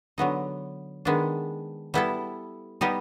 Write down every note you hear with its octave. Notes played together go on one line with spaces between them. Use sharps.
D3 F#3 B3 D#4
D#3 G#3 B3 D4
G3 B3 E4 A4
G3 B3 D#4 G4